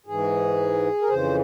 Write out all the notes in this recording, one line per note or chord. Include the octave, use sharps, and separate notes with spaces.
G#2 E3 G#4
A#4
F2 C#3 E3 C5